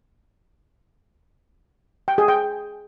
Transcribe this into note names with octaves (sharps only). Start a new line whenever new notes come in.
G5
G#4
G5